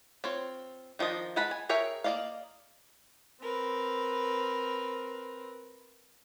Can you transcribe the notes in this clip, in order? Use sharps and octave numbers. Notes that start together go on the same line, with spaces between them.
C4 F4 C#5
D#3 F3 D4 D#5
G#3 B4 F#5 A5 B5
G#5
G#4 A#4 C#5 E5 G5
A#3 A4 D5 D#5 F5
C4 A#4 B4